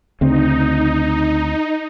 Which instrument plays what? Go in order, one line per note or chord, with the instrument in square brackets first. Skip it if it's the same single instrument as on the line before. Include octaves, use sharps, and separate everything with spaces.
[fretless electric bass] D2 C#3 C4 [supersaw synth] D#4